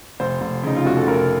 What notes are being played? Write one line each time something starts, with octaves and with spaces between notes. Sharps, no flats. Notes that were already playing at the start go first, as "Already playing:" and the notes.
F1 C5
F1
C#3 D#4
F4
F1 F#4
A4
F1 A#4